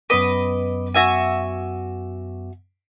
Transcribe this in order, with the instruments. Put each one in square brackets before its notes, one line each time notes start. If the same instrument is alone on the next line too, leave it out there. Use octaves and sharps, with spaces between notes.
[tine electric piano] F#2 B3 D6 [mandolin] B4 D#5
[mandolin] F#4 E5 G#5